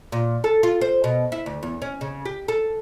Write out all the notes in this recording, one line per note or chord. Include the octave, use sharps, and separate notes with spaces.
A#2
A4
F4
C5
B2
E4
D2
E2
C#4
C#3
G4
A4